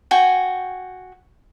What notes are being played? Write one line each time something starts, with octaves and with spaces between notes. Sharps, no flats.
F#4 G5 G#5